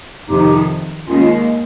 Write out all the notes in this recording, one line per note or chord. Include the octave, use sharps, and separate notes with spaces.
F2 C3 D#3 D#4 G4
D#2 D#3 G#3 C#4 F4